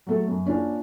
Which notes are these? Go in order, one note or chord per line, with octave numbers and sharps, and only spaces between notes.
F#3 A3 A4
F#2
A#3 C#4 D4 F4